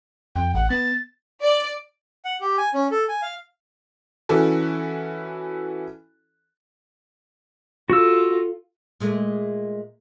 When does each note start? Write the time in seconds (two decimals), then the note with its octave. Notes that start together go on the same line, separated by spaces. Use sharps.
0.36 F2 G5
0.55 A1 F#5
0.70 B3 A6
1.43 D5
2.25 F#5
2.41 G4
2.58 G#5
2.74 C#4
2.91 A4
3.09 G#5
3.22 F5
4.29 E3 C#4 E4 F#4 A4
7.90 F4 F#4 A4 E6
9.00 A#2 G#3 A3